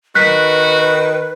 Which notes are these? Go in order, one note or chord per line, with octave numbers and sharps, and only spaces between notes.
D#3 F#4 B4 F#6 B6